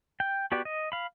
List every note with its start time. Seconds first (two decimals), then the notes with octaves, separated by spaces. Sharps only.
0.20 G5
0.52 B3 F#4 G4 D5
0.65 D#5
0.92 F5 B5